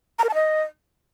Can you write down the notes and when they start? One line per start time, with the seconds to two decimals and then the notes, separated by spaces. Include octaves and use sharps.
0.19 A#5
0.24 A#4
0.29 A5
0.34 D#5